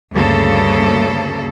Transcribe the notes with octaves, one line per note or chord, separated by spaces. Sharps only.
D2 G2 C#3 A#3 A4